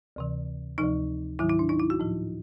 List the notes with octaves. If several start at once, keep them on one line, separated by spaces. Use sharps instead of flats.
D2 C3 E3
D2 C3 F3 D#4
G#2 D#3 F#3 E4
E4
D4
D#4
E4
F#4
A2 F3